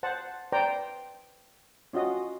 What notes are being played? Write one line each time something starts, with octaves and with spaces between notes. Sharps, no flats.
C5 F#5 A5
B4 C5 D5 G5 A#5
C#4 F4 F#4 D#5